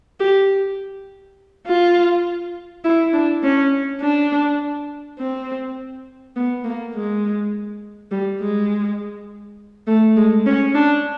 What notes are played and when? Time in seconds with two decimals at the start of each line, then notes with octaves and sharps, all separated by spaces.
0.20 G4
1.67 F4
2.84 E4
3.13 D4
3.43 C#4
4.01 D4
5.19 C4
6.36 B3
6.64 A#3
6.94 G#3
8.11 G3
8.40 G#3
9.87 A3
10.17 G#3
10.46 C#4
10.75 D4